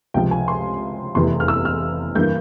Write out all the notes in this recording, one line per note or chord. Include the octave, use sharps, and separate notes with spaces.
C#2 C3 F3 G5
G#5
C6
F1 E2 C3 E3 C6
F6
E6
F6
G2 E3 A#3 G6